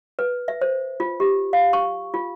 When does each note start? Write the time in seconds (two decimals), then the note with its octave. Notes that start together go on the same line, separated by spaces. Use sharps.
0.19 B4
0.48 E5
0.61 C5
1.00 F4
1.20 G4
1.53 F5
1.73 C#6
2.14 F4